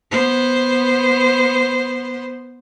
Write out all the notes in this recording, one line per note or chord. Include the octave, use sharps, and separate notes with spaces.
B3 C5